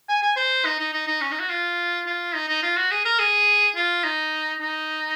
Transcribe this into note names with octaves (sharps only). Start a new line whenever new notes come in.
G#5
G#5
C5
D#4
D#4
D#4
D#4
C#4
D#4
F#4
F4
F4
D#4
D#4
F4
F#4
G#4
A#4
G#4
F4
D#4
D#4